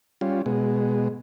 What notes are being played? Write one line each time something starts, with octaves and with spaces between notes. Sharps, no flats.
G3 C#4 F4
B2 G#3